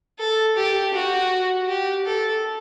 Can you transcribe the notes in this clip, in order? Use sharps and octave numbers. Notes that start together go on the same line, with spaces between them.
A4
G4
F#4
G4
A4